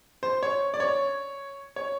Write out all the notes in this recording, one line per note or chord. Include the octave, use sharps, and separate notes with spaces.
C5
C#5
D5
C#5
C#5